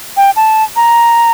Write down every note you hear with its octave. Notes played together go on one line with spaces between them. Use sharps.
G5
A5
A#5